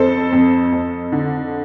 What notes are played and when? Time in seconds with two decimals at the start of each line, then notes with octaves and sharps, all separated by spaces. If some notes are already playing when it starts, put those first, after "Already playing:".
Already playing: F2 A4 C5
0.32 F2
0.72 F2
1.12 D3